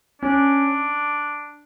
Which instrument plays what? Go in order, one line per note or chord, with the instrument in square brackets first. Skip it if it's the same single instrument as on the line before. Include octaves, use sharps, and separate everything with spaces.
[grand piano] C#4 [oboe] D4